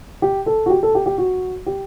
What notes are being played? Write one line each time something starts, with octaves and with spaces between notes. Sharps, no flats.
G4
A4
F#4
G4
A4
G4
G4
F#4
G4